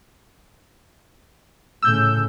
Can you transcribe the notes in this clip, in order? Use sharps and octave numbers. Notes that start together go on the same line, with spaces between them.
A2 C#3 E6 G6